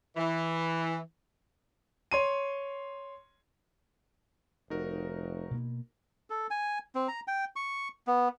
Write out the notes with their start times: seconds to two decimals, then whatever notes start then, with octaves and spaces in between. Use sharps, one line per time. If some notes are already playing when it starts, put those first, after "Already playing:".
0.17 E3
2.11 C#5 C6 D#7
4.70 F1 D#4 F#4 A#4
5.51 B2 A#3
6.30 A4
6.51 G#5
6.95 C4
7.08 A#5
7.28 G5
7.56 C#6
8.07 B3